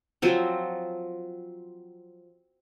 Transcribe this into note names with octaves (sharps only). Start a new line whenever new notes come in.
F3 F#3 C4